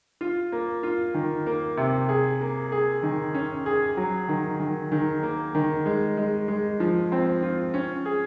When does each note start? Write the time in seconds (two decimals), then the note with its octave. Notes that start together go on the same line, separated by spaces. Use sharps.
0.21 F4
0.52 A#3
0.83 F4
1.14 D#3
1.47 A#3
1.77 C3
2.09 G#4
2.41 A#3
2.72 G#4
3.03 D#3
3.34 C#4
3.66 G#4
3.97 F#3
4.29 D#3
4.60 D#3
4.92 D#3
5.23 A#3
5.55 D#3
5.86 G#3
6.17 G#3
6.48 G#3
6.80 F3
7.12 C4
7.43 F4
7.74 C#4
8.05 G#4